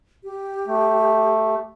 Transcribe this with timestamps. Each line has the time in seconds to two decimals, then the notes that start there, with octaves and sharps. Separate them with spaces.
0.24 G4
0.67 A3